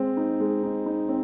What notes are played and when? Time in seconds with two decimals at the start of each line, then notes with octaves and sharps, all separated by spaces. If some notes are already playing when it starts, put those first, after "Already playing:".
Already playing: G#3 C4
0.17 D#4
0.40 G#3
0.63 D#4
0.86 D#4
1.09 C4